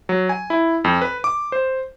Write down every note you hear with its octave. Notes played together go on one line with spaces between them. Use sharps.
F#3
G#5
E4
F2
B4
D6
C5